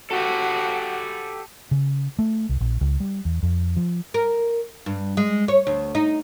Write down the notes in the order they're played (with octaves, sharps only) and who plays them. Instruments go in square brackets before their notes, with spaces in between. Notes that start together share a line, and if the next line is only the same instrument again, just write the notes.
[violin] F#4 [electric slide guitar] G4 A4
[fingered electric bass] C#3
A3
C2
A#1
C#2
G3
E2
F2
F3
[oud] A#4
G2
G#3
C#5
D2
D#4